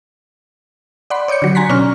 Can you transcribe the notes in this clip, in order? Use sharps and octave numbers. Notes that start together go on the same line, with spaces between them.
D5 F#5 B5 C6
C#5 D5 D6 G6 C#7
D3 F#3
G#5 A#5 C6 F#6 A#6 B6
B2 C#4 D4 D5 C#6 F6